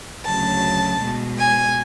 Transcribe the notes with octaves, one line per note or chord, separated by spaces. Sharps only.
D2 C#3 F#3 A5
B2 G#3
G#5